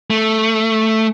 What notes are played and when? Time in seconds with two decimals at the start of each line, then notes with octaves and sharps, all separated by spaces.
0.10 A3